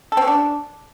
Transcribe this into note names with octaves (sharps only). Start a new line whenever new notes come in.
A4
C4
C#4
D4